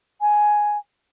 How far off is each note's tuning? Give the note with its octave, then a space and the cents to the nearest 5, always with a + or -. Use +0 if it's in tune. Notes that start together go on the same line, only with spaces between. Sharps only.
G#5 +5